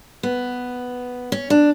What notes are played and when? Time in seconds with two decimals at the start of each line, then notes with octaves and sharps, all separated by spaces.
0.23 B3
1.32 C#4
1.50 D4